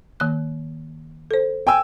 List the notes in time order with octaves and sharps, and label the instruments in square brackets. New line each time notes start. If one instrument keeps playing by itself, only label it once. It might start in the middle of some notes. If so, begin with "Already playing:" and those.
[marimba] D#3 A#3 F#6
A4 C5
[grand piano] G5 G#5 E6